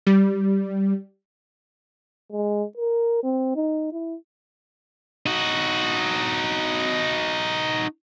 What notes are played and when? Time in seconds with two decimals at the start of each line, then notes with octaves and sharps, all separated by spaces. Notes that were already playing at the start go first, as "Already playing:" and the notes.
0.07 G3
2.32 G#3
2.77 A#4
3.23 C4
3.56 D#4
3.92 E4
5.26 D#4 F#4